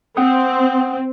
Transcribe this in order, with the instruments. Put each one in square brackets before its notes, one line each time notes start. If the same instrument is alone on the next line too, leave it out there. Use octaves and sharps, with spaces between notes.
[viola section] C4 [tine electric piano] F#5 G5 D#6